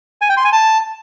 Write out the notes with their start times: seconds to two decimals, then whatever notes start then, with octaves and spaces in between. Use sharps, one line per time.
0.21 G#5
0.29 G5
0.37 C6
0.45 G#5
0.53 A5